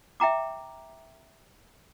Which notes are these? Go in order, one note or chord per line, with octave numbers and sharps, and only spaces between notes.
E5 G5 A#5 D6